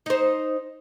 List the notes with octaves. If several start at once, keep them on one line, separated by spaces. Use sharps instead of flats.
D#4 C5